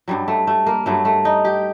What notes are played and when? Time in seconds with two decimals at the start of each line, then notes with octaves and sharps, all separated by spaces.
0.08 G2 F#3 G3
0.28 A3
0.47 A3
0.66 A#3
0.86 G2 F#3 A3
1.05 A3
1.25 D#4
1.45 G4